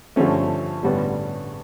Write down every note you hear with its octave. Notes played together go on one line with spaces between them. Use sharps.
G2 D3 F3 A3 C#4
A1 G2 D3 G3 B3